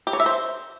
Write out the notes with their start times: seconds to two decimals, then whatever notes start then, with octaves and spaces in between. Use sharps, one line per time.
0.07 G4
0.13 C#5
0.20 E5
0.26 C5